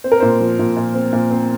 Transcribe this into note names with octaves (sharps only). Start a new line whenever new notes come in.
C4 C5
A#4
A#2 C5
F3
A#2
A#2
C4
A#2
C4